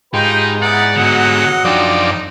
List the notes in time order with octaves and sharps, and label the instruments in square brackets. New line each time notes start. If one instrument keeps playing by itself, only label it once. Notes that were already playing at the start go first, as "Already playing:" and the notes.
[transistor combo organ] G#2 [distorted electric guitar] D#4 [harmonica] F4 G4 B4 [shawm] G5
[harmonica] B3 D#4 E4 [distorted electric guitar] D5 [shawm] F#5
[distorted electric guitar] D3 B3 [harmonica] F#3 D#5
[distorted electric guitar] F#2 G5 [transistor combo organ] F3 D4 D5 [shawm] D#4